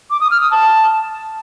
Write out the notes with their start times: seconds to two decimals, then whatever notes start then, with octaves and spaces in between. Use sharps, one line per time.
0.10 D6
0.21 D#6
0.31 F6
0.41 D#6
0.51 A5